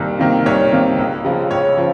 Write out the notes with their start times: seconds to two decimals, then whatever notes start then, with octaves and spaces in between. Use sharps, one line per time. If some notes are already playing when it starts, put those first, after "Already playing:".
Already playing: C2 C3 D#3 A#3
0.19 C3 D#3 A#3
0.46 C2 C#5
0.72 C3 D#3 A#3
0.98 C#2
1.24 C#3 F3 G#3 C#4
1.51 C#2 C#5
1.77 C#3 F3